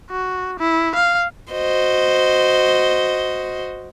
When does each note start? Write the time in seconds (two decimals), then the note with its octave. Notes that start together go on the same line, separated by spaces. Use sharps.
0.11 F#4
0.59 E4
0.95 F5
1.52 F#4 C5 D#5